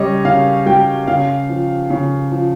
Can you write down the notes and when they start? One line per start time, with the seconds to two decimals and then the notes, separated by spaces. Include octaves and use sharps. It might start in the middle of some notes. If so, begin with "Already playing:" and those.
Already playing: C#3 G3 C#5 D#5
0.25 C#3 F5
0.66 G3 G5
1.08 C#3 F5
1.49 F3
1.90 C#3
2.32 F3